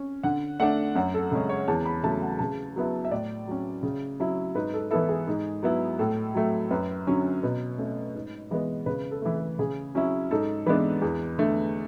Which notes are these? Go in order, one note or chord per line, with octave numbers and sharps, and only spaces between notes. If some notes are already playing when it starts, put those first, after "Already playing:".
Already playing: C#4
D3 F#5
A3 D4 F#5
F#2 F#5
A4
C#3 G#3 C#4 A4
C#5
E2 A5
B5
C#3 F#3 A3 A5
F#5
C#3 A5
F#3 B3 E4
E5
A2 D5
F#3 C#4
C#3
F#3 C#4 E4
G#2 B4
A4
E3 B3 E4 A4
G#4
G#2
F#3 B3 E4
A2 A4
F#3 A3
F#2 B4
D3 F#3 C#4
B2 B4
A3 C#4
G#2
E3 G#3 B3
C#3 B4
A4
E3 A3
A4
C#3 G#4
F#3 C#4 E4
G#2 A4
E3 G#3 B3 D4 B4
E2
D3 A3